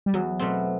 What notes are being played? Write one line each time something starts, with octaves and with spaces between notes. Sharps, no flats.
G3
E2 F#3
B2 A3 C4